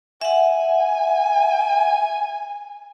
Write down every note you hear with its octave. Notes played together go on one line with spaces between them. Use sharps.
E5 F#5 G#5